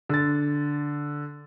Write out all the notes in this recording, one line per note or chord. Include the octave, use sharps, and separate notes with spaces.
D3 A6